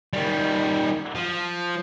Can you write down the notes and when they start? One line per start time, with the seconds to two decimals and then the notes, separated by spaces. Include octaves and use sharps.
0.13 D#3 G3
1.15 F3